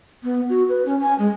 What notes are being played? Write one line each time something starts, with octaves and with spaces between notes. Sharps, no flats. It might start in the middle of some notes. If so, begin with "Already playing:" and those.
B3
F#4
B4
C#4
G#5
G#3